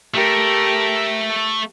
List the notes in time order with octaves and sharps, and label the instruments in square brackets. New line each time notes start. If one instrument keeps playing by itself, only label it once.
[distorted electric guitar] A3 [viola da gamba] G4 A#4